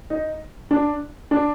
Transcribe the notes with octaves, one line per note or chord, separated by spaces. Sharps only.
D#4
D4
D4